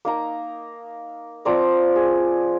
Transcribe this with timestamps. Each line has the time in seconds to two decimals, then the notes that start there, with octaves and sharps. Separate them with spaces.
0.05 A#3 D#4 A#5
1.45 F3 C4 D5 A#5
1.96 G#4